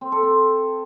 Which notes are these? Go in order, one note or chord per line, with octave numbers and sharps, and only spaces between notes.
C4
A4
C4